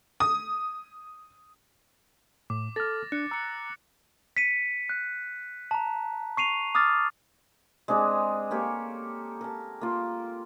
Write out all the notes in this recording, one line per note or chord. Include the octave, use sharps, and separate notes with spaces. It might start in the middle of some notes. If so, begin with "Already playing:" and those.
D#6
A2 D6
A4 F6 A6 A#6
D4 F#6 C#7
A#5 E6 C#7
B6 C#7 D#7
F#6
A5 A#5
C#6 C7 D#7 F7
D6 D#6 F6 A6
G#3 C4 D4 G#4
A#3 G4 A4 C#5
A#4 A5
A#3 F4